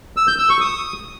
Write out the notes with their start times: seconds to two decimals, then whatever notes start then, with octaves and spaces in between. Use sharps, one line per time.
0.17 E6
0.28 G6
0.39 E6
0.50 C#6
0.61 D#6